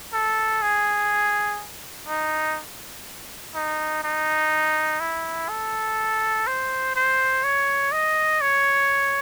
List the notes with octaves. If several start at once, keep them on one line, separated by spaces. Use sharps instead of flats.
A4
G#4
D#4
D#4
D#4
E4
A4
C5
C5
C#5
D#5
C#5